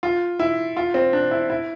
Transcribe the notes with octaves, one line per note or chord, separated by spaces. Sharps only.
F4
E4
F4
C4
D4
E4
E4